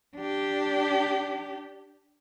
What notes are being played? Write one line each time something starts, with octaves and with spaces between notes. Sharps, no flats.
D4 G4